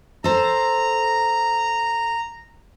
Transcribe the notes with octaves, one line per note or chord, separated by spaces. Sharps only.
A4 C5 A#5